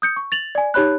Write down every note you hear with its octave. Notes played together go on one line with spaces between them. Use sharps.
D#6 G6 C#7
C#6
A6 F7 F#7
D5 G#5
D#4 G4 C#5 B5 F#6